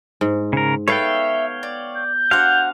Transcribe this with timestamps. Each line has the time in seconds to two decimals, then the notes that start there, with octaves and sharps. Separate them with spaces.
0.21 G#2
0.53 C#3 A#4
0.88 B3 A4 C#5 E5 F5 G5
1.63 D5
1.97 G6
2.31 D4 F#4 C5 F5 F#5